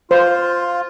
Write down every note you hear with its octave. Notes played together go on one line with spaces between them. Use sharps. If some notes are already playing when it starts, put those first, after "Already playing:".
F4 C5